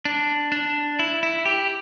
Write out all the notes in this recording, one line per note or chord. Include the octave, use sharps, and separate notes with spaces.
D4
D4
E4
E4
G4